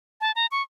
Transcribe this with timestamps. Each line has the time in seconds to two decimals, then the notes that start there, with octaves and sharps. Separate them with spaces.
0.21 A5
0.36 A#5
0.51 C#6